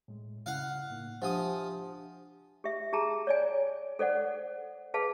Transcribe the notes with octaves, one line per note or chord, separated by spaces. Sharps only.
A2 G#3
G2 C#3 E4 F5 F#5
A2 A#3 D#4
F3 D4 G4 C5 E5 F#5 G#5 D#6
G4 E5
G4 G#4 A5 A#5
C#5 D5 G#5
A4 C5 D5 F#5
G#4 B4 F5 A5